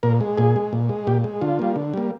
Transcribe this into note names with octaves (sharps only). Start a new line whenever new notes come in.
A#2 A#4
G#3
A#2 G#4
G#3
A#2
G#3
A#2 G4
G#3
D3 F4
G3 A#3
D3
G3 A#3